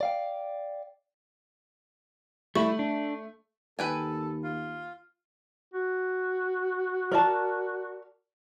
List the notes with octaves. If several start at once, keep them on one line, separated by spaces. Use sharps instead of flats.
D5 F5 G5
G3 A3 E4 C#6
D4
D#2 A4 B4 G5 G#5
F4
F#4
A#4 D5 A5